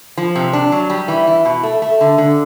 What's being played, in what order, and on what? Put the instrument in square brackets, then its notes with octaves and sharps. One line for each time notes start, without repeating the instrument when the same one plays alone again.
[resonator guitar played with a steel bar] F3
C3
D4
F#3
G3
E3
E4
B2
A3
A3
D3
D3